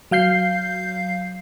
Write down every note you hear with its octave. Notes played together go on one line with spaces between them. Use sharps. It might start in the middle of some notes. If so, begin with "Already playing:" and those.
F#3 F5 G6 C7